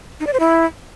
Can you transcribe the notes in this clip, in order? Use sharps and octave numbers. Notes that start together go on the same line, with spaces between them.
D#4
D5
C5
E4